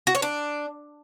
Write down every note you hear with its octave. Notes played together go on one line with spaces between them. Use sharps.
F#4
C#5
D4